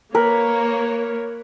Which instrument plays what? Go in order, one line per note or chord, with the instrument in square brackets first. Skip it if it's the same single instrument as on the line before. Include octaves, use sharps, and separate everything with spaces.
[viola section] A#3 C#5 [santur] A#4 B4